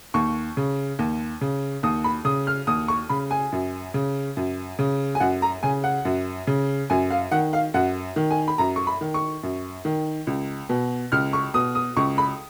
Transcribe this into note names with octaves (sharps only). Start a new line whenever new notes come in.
D#2 C#6
C#3
D#2
C#3
D#2 D#6
B5
C#3 D#6
F6
D#2 D#6
C#6
C#3 B5
G#5
F#2
C#3
F#2
C#3
G#5
F#2 F#5
A#5
C#3 G#5
F#5
F#2
C#3
F#2 G#5
F5
D#3 F#5
F5
F#2 F#5
D#3
G#5
B5
F#2 A#5
C#6
B5
D#3
C#6
F#2
D#3
C#2
B2
C#2 F6
C#6
B2 D#6
D#6
C#2 C#6
B5